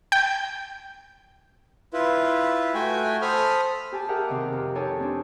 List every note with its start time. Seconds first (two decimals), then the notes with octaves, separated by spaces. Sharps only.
0.12 G5
1.93 E4 F4 B4
2.74 A3 F#4 G5 G#5
3.22 A4 C5 B5 D#6 F6
3.92 G4 G#5 A5
4.08 G4 G#4 A#4 E5 F#5 G5
4.27 C3 D#3 D#5 D6
4.53 F2
4.75 D#4 G4 A4 C#5 G#5
5.00 C4 D4